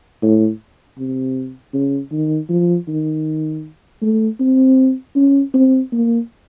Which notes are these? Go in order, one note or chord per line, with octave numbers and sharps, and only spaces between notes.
A2
C3
C#3
D#3
F3
D#3
A3
C4
C#4
C4
A#3